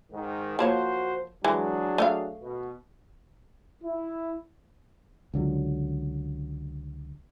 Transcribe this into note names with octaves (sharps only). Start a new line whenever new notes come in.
G#2 D#3
F3 A#3 F#4 C5 C#5
E3 F#3 G#3 D4 G#4
A3 D#5 F5
B2
E4
C#2 D3 F#3